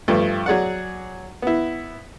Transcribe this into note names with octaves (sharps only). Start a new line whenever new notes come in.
G2 F3 A3
F#3 G#4 D5 F#5
B3 E4